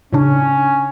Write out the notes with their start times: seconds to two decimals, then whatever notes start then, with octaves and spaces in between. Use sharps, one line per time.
0.12 A2 C#3 C#4 D4